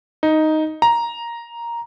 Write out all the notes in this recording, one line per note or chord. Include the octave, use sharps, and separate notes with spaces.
D#4
A#5